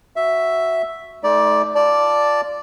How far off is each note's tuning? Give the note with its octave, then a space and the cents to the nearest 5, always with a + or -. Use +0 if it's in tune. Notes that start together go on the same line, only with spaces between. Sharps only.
F#4 +0 E5 +0
A3 -30 D#4 +30 D5 +0
F4 -5 D5 +0 A5 +0